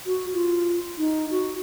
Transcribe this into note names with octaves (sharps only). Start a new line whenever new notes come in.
F#4
F4
D#4
F#4